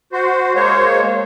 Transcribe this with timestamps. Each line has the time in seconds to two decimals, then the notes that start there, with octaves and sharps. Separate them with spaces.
0.12 F#4 C5
0.55 G#3 A#3 C5 C#5